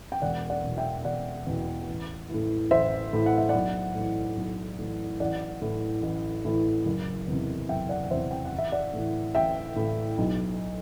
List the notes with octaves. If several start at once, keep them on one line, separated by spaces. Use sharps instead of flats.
G5
E1 D5 F#5
D5 F#5
E2 B2
E5 G5
E1 D5 F#5
E2 B2
A1
A2 E3
A1 C5 E5
A2 E3
F#5
E5
B1 D5 F#5
A2 E3
B1
A2 E3
A1 D5 F#5
A2 E3
A1
A2 E3
F#1
E2 C3
F#1 E5 G5
D5 F#5
F#5
E2 C3 C5 E5
G5
F#5
A1
E5
D5 F#5
A2 E3
A1 E5 G5
A2 E3
B1